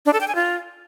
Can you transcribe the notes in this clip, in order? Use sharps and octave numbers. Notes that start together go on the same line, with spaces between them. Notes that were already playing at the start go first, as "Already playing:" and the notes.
D4
A4
G5
G#5
F4